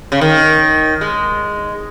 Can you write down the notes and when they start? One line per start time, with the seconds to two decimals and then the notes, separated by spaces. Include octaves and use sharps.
0.12 C#3
0.21 D#3
1.01 G#3